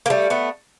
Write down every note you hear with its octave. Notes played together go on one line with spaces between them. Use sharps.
A#3
G3 A3
A3 B3